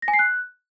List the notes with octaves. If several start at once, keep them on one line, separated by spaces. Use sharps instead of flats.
A#6
G#5
C7
F#6